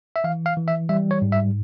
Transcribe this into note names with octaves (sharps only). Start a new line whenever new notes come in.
E5
E3 F5
F5
E3
E5
G3 E5
C#5
G#2
E5